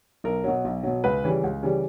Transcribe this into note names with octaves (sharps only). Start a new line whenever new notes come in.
B1 A#4
B2 F#3
B1
B2 F#3
C#2 B4
C#3 E3 G3
C#2
C#3 E3 G3